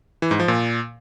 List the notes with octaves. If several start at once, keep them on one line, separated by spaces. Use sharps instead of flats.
E3
G#2
F3
A#2